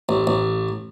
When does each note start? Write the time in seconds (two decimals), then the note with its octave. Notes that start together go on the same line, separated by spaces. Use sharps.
0.09 A1
0.27 A1